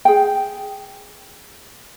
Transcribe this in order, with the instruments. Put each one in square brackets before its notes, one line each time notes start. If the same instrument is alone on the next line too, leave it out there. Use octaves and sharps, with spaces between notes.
[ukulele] G#4 G5